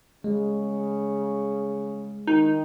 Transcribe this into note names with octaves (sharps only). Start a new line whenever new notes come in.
C#3 G#3
D#3 D#4